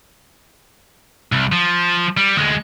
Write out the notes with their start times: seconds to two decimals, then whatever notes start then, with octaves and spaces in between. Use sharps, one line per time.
1.32 C2
1.52 F3
2.17 G3
2.37 D2 G#3